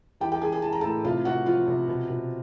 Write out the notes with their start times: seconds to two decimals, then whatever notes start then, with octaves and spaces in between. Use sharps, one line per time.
0.20 E3 G4 G5
0.32 G4 G5
0.41 E3 G#4 G#5
0.52 G#4 G#5
0.62 E3 A5
0.72 A#5
0.81 A2 A4 A5
1.05 C3 F4 F5
1.25 C3 F#4 F#5
1.46 F3 F4 F5
1.68 C3
1.88 B2
2.09 B2